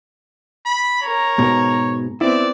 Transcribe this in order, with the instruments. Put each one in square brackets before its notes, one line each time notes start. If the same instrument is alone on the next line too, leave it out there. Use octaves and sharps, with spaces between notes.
[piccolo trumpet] B5
[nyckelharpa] A#4 A#5 [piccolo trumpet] C#5
[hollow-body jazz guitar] G#2 B2
[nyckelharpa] B3 C4 [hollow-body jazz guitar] E4 [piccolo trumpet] D5